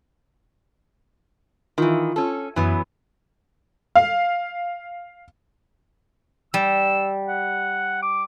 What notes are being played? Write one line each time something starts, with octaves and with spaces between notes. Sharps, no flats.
D#3 E3 F4
C#4 A4
F#2 E3 F#3 B3
F5
G3 E6
F#5
D6